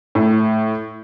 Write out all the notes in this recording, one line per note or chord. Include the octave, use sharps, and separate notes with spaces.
A2